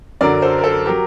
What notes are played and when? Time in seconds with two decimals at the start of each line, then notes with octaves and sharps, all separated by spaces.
0.21 F#2 D3 F#3 A#4 D5
0.42 A4 C5
0.59 A#4
0.64 A4 C5
0.86 F#3 G4 A#4